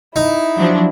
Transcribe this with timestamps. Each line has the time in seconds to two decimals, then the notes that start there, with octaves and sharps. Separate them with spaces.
0.16 D#4 E4
0.57 F3 F#3 D4